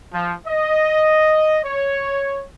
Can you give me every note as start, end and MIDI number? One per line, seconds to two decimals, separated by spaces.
0.13 0.34 53
0.47 1.59 75
1.65 2.42 73